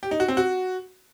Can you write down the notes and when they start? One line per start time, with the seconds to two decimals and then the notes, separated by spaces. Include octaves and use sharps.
0.03 G4
0.11 D#4
0.20 F#4
0.28 C4
0.37 F#4